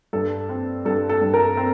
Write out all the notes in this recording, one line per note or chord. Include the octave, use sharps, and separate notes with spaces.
G2 A4
C4
G2 A4
A4
G2
A#4
C4